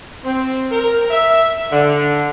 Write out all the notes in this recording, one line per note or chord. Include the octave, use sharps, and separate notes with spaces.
C4
A#4
E5
D3